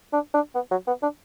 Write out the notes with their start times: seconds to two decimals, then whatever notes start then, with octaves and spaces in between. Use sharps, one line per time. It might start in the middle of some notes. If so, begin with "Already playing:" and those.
0.13 D4
0.34 D4
0.55 B3
0.71 F#3
0.87 B3
1.02 D4